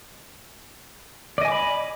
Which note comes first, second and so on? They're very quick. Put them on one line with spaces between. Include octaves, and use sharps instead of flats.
D5 D#5 G#5 D6 B5